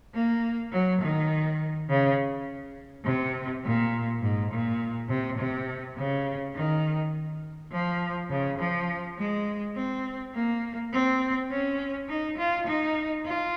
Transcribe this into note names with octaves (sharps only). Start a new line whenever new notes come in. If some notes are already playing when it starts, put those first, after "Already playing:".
A#3
F#3
D#3
C#3
C3
A#2
G#2
A#2
C3
C3
C#3
D#3
F3
C#3
F3
G#3
C4
A#3
C4
C#4
D#4
F4
D#4
F4